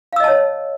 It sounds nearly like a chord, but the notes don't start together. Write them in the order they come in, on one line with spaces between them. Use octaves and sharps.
F5 E6 D#5 A5 C#5